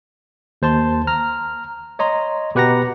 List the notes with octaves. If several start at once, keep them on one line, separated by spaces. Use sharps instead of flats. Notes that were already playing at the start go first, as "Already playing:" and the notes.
D#2 C5 A5 C6
A#5 F6
C#5 D#5 A#5 C6
B2 G4 B4 F#5 A#5 A#6